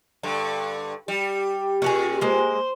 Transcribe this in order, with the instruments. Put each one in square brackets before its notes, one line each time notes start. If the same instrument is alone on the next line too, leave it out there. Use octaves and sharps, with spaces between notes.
[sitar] G2 D3
[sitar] G3 [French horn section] G4
[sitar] A#2 [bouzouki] C#4 F#4 G#4
[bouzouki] G#3 A#3 [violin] C5